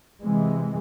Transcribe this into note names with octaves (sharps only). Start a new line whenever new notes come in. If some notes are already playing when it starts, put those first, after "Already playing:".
C3 E3 G#3